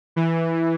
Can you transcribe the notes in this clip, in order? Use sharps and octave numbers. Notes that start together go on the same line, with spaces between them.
E3